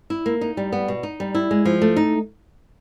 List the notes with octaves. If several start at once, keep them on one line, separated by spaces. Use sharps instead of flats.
E4
A#3
D#4
G3
B3
B2
D#4
G3
E4
G#3
F3
A3
D#4